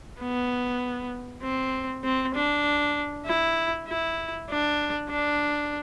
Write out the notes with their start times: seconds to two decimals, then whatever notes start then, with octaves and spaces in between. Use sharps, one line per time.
0.20 B3
1.43 C4
2.04 C4
2.34 D4
3.26 E4
3.87 E4
4.49 D4
5.10 D4